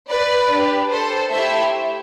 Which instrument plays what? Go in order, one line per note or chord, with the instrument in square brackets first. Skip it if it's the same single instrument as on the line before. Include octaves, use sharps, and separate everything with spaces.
[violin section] B4 D5
D4 G4
A4 C5
A3 E4 G4 C5 E5